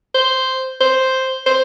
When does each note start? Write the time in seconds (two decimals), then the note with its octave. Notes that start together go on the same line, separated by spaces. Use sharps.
0.14 C5
0.80 C5
1.46 C5